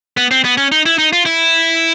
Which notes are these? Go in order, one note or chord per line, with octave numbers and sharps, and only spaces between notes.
B3
C4
B3
C#4
D#4
E4
D#4
F4
E4